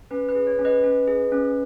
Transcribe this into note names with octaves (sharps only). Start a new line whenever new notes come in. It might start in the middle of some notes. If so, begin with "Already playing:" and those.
C#4 B4
B4
G#4
C#5
C#4
B4 D#5
C#4
G#4
C#4